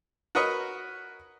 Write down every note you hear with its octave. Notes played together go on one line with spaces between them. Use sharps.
F#4 A#4 B4 C#5 D#5